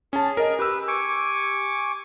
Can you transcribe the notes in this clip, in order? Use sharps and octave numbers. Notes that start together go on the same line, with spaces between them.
C#4 G#4 A5
A#4 D#5
G4 B4 E6
G#5 C#6 D6